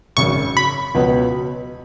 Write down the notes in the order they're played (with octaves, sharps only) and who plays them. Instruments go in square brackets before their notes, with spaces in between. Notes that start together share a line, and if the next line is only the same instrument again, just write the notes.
[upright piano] G#1 F#2 C#3 [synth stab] C#6
[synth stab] B5
[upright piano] C#2 B2 F#3 B3